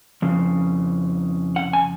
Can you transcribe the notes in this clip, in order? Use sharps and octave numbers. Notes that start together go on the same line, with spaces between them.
F2 C#3
F#5
G#5